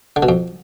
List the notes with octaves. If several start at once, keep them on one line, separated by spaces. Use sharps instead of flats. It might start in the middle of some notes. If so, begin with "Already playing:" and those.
D3
B2
F2